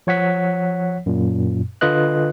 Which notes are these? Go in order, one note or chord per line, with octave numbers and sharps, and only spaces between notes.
F3 C#5 F#5 B6
F#2 A#2
D3 F4 B4 D#5 F#6